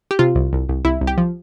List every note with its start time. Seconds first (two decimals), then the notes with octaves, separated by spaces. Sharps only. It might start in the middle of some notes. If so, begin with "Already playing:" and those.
0.11 G4
0.19 C3 F4
0.35 C2
0.53 C2
0.69 C2
0.85 C2 E4
1.01 C2
1.07 G4
1.18 F3